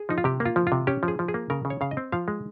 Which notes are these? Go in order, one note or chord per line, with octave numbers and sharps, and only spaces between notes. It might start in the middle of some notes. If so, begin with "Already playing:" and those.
Already playing: G#4
F3 D#4
F4
C3 G4
A#3
F4
F3
C3 F4
C#4 G4
F3
G#4
F3
G#4
A#3
C#3 A#4
C#3
C#5
C#3 F5
D#5
C4
F3 F5
G#3